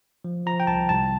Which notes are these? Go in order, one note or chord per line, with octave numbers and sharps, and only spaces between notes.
F3
F3 A#5
G5
C2 A5
C2 A5